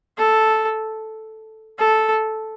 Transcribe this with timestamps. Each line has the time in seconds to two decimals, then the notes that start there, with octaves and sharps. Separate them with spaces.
0.18 A4
1.79 A4